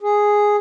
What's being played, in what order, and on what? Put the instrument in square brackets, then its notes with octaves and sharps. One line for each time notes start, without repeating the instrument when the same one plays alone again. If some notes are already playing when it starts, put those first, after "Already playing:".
[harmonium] G#4